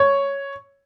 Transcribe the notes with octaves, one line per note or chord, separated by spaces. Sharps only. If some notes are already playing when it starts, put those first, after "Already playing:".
Already playing: C#5